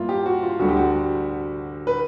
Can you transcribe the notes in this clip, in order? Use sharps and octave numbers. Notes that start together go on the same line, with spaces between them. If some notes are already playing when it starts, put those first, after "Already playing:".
Already playing: G2 A#3 E4 F4
G4
F#4
F4
D2 D3 G3 F#4
G4
F#4
B4